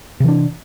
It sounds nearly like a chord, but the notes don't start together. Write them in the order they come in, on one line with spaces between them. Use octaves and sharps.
C3 E3 D4